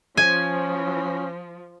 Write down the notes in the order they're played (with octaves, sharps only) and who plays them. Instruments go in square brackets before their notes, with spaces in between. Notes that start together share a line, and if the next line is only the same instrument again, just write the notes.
[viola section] F3 [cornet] C#4 [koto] G#5